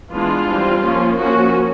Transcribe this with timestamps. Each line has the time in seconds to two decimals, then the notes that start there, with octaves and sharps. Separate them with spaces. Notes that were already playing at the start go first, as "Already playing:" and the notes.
0.11 E3 G#3 B3 D4 F4
0.46 E3 G3 C4
0.81 F3 A#3 C#4
1.16 F3 A#3 C#4 F#4